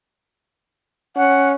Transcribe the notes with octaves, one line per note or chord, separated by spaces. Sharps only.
C#4 F#5